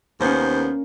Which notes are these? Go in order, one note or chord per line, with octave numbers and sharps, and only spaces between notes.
D#2 A#3 B3 C#4 C5